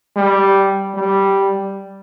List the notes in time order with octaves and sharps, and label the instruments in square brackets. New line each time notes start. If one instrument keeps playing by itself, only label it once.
[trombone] G3
G3